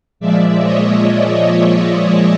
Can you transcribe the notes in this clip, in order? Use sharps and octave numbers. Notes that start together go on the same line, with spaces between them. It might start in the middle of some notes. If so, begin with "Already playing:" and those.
A#2 F3 G#3 D5 E5
C#5 D#5
D5 E5
C#5 D#5